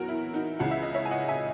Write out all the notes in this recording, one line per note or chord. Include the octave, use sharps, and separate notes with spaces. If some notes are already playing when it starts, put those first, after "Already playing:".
Already playing: E2 F#3 F#4 A#4
E4
D#4 F#4
C#2 C#3 E3 F#5
E5
D#5
C#5 E5
G#5
D#5 F#5
E5 G#5